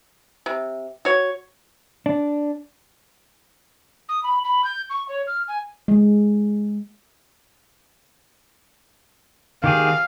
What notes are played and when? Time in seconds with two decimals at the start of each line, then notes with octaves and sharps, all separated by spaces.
0.46 C3
1.05 F#4 C#5
2.06 D4
4.08 D#6
4.23 B5
4.44 B5
4.64 G6
4.90 C#6
5.08 C#5
5.27 F6
5.48 G#5
5.88 G#3
9.64 D#3 G4 G#4 F5